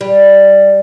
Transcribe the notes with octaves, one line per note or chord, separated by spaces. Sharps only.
G3